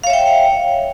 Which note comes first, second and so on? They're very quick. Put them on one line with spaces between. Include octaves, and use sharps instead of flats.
F5 C#5 E5 G5